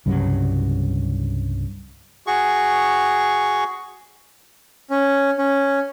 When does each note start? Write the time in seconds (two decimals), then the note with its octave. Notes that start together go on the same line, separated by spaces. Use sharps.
0.06 C2 G2 C#3 F#3
2.27 F#4 G#4 C#6
4.90 C#4
5.38 C#4